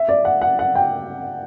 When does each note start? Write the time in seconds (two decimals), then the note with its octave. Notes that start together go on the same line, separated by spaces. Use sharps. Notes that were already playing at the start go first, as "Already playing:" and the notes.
Already playing: E5
0.08 D5
0.25 F#5
0.42 F#5
0.59 F#5
0.75 G5